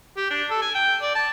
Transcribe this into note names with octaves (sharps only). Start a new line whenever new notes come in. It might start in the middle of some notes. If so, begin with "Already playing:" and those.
G4
D4
A4
G#5
G5
D5
A5